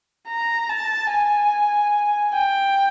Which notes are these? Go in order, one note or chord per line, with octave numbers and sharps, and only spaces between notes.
A#5
A5
G#5
G5